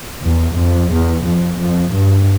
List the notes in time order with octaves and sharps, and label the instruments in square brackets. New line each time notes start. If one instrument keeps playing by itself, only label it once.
[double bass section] E2
F2
E2
F2
F2
G2